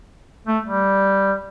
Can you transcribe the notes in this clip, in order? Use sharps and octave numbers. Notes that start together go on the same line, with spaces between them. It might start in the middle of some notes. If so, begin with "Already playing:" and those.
A3
G3